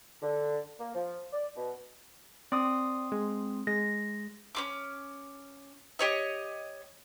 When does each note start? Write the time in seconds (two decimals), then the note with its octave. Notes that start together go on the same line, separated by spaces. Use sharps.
0.23 D3
0.79 A#3
0.95 F3
1.33 D5
1.56 B2
2.52 C4 D5 C6 D#6
3.12 G#3
3.67 G#3 A#6
4.55 C#4 F4 D6
5.99 G4 C#5 D#5